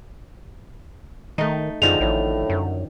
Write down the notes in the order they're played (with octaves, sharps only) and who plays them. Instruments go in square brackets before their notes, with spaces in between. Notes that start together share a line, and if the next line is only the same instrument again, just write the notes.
[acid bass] D#3 [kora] A3 D#4
[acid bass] F#2 [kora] D3 D#3 F3 [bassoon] G#3 [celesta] F7
[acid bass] A1 [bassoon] A2
[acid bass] F#2